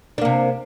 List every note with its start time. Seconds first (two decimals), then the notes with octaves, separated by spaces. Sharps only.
0.18 D4
0.21 A#3
0.25 C3